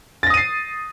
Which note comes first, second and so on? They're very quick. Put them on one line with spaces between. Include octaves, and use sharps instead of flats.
A6 A#6 D#6 D#7 C7